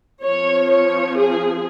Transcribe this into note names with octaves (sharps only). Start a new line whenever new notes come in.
F3 C4 C#5
C#5
G#4